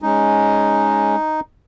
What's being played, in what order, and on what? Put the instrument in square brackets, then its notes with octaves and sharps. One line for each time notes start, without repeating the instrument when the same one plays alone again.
[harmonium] G#3 C#4 [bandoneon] D#4